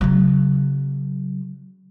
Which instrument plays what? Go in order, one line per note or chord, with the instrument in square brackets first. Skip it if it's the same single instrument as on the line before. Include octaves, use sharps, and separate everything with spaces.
[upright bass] C#3 F#3